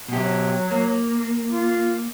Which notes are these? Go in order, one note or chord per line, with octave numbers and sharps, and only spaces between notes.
B2 F#3 G4
A#3
F4